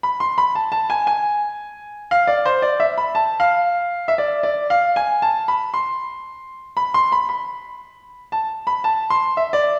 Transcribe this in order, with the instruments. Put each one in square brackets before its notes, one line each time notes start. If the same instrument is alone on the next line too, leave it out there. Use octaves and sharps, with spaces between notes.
[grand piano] B5
C6
B5
A5
A5
G#5
G#5
F5
D5
C5
D5
E5
B5
A5
F5
E5
D5
D5
F5
G#5
A5
B5
C6
B5
C6
B5
B5
A5
B5
A5
C6
E5
D5